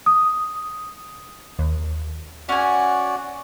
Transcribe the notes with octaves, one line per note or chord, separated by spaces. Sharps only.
D#6
D#2
C#4 F#4 D5 F#5 G#5